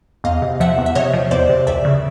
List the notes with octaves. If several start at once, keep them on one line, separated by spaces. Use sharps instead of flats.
E2 D#5 F5
C3
F3 E5 F#5
E2
E5
C3 C#5 D#5
F3
E2 C5 D5
C3
C#2 D5 E5
C#3